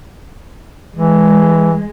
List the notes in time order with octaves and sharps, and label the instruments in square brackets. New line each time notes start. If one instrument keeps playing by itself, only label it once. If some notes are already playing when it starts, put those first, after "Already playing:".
[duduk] E3 [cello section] G#3